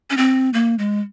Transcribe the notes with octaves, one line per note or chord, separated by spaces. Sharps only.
C#4
C4
A#3
G#3